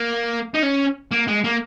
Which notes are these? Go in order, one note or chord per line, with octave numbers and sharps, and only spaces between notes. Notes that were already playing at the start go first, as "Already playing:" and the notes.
Already playing: A#3
D#4
C#4
A#3
G#3
A#3